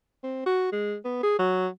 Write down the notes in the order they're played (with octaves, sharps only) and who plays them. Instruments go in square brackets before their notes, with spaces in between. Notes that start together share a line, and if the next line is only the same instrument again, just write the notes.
[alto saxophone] C4
F#4
G#3
B3
G#4
F#3